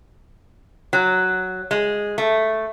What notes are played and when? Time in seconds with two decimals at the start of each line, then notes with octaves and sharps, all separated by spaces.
0.93 F#3
1.71 G#3
2.18 A3